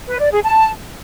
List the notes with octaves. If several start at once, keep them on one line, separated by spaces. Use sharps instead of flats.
B4
D5
G#4
A5